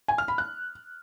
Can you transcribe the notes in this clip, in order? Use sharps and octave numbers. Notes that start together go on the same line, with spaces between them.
G#5
F6
B5
F#6